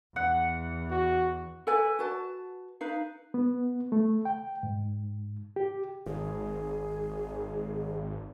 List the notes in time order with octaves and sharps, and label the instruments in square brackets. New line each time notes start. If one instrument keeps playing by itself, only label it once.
[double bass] E2 [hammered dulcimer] F#5
[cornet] F#4
[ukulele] A4 B4 D5 G#5
F#4 B4 A5
D#4 B4 F5
[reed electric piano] B3
A3
G5
G#2
G4
[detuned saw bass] G#1 [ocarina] G#4